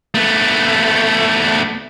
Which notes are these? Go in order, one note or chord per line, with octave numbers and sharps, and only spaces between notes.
A3 B3